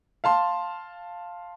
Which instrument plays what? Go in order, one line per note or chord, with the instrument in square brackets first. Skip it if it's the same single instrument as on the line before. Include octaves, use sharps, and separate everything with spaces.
[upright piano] F5 A5 C6